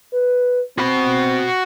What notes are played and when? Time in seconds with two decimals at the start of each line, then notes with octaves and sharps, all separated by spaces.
0.13 B4
0.78 C4 F#4 B5